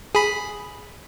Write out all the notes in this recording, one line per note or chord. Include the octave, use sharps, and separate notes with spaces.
G#4 B5